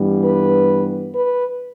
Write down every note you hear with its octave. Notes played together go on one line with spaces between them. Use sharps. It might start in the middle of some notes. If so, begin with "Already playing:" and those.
Already playing: G2 E3 G3 B3
B4
B4